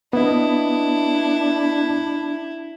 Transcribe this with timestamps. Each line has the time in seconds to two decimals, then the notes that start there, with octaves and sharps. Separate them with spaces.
0.13 B3 D4 E4 D#5